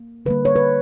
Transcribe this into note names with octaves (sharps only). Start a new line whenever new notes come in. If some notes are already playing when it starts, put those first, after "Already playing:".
Already playing: A#3
D3 G3 A#3 B4
C#5
B4